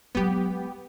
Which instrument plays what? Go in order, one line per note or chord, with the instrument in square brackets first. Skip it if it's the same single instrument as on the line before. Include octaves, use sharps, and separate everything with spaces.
[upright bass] F#3 G#3 [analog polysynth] B3 G4